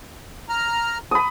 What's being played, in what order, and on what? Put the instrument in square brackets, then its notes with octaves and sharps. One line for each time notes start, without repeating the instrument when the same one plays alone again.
[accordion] A#5 F6
[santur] B5 D#6